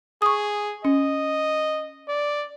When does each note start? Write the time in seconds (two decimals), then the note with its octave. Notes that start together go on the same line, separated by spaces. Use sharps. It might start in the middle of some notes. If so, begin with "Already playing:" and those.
0.22 G#4 C#6 D#6
0.85 C#4 D#5
2.08 D5